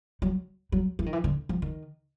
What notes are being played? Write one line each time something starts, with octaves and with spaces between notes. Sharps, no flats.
F#3
F#3
E3
D#3
E3
D3
F3
D#3